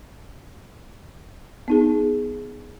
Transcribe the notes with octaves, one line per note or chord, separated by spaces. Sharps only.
B3 D#4 G#4